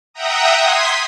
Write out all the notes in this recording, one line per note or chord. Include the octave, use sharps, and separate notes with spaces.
E5 F#5 G5 A#5 D#6
C6 D#6 G#6 B6